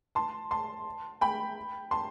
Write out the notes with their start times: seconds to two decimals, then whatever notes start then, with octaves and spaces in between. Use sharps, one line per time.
0.15 A5 C6
0.51 A5 C6
1.21 G5 B5
1.91 A5 C6